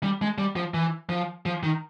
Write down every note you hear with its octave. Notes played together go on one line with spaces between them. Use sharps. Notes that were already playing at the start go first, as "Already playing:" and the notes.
G3
G#3
G3
F3
E3
F3
F3
D#3